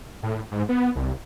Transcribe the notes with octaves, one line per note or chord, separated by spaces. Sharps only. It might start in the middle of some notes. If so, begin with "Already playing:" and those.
A2
G#2
B3
C2